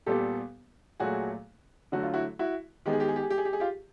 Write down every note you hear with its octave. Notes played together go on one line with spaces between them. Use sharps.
A#2 G3 B3 G4 A4
A#2 F#3 A3 F#4 G#4
D3 F#3 A3 F#4
F4
E4 F#4
E4 F#4
D#3 G#3 B3 G4
G#4
G4
G#4
G4
G#4
G4
G#4
G4
G#4
F4 G4